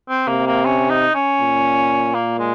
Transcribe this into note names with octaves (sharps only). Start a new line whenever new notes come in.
C4
C3 A#3
A#3
C#4
D#4
C#4
A#2
A#3
G#3